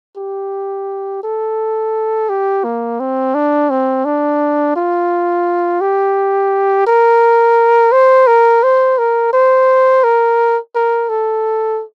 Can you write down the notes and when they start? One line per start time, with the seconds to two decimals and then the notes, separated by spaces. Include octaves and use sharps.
0.17 G4
1.23 A4
2.29 G4
2.64 A#3
3.00 C4
3.34 D4
3.70 C4
4.05 D4
4.76 F4
5.81 G4
6.87 A#4
7.92 C5
8.27 A#4
8.63 C5
8.98 A#4
9.33 C5
10.04 A#4
10.75 A#4
11.09 A4